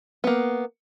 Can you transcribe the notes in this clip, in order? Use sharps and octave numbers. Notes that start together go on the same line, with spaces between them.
A#3 B3